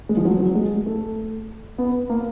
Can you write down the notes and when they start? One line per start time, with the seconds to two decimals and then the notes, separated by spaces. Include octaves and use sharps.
0.09 G#3
0.17 F3
0.25 F#3
0.40 F#3
0.55 G#3
0.86 A3
1.78 B3
2.10 A#3